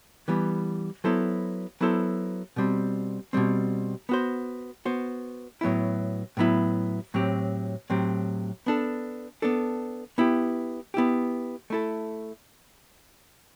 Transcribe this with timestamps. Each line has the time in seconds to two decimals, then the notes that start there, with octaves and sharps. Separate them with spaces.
0.28 E3 G3 B3
1.04 F#3 B3 E4 A4 C5
1.81 F#3 B3 E4 A4 C5
2.56 B2 G3 C4
3.33 B2 G3 C4
4.09 B3 F#4 C5
4.85 B3 F#4 C5
5.61 A2 F#3 B3 E4
6.37 A2 F#3 B3 E4
7.14 A2 F#3 C4 G4
7.90 A2 F#3 C4 G4
8.66 B3 D4 A4
9.42 B3 D4 A4
10.18 B3 E4 G4
10.94 B3 E4 G4
11.70 A3 E4 A4